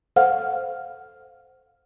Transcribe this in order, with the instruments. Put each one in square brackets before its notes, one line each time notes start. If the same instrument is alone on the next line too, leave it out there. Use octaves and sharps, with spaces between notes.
[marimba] A4 C5 F5 F#5 F6